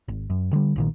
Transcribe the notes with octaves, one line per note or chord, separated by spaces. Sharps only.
G#1
F#2
D3 G3
A#1 A#2 D#3